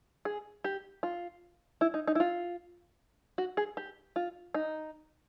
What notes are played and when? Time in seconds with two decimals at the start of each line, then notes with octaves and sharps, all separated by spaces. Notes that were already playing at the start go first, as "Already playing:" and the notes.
0.25 G#4
0.64 G4
1.03 F4
1.81 E4
1.94 D#4
2.07 D#4
2.15 E4
2.20 F4
3.38 F#4
3.57 G#4
3.77 G4
4.16 F4
4.54 D#4